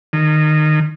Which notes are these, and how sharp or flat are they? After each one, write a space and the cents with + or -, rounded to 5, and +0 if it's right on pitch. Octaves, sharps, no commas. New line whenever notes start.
D#3 -25